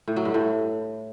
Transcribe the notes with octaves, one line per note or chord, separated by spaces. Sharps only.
A2
F#3
G2
A2